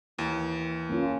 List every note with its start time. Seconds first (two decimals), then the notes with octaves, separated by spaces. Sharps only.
0.19 D#2 E3
0.90 A#3 C#4 F4